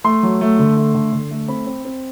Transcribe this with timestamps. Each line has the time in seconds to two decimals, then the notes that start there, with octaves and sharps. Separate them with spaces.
0.04 A3 C6
0.23 F#3
0.41 A3
0.59 D3
0.77 A3
0.94 D3
1.13 D3
1.31 A3
1.48 C4 B5
1.66 C4
1.85 C4